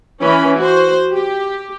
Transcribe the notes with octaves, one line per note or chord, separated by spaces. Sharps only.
E3 C#4 B5
F#4 C5
G4